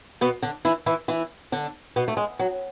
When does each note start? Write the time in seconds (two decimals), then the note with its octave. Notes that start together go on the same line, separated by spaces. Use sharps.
0.21 B2 B3
0.42 D3 D4
0.65 E3 E4
0.86 E3 E4
1.08 E3 E4
1.52 D3 D4
1.96 B2 B3
2.08 A3
2.17 G#3
2.39 F#3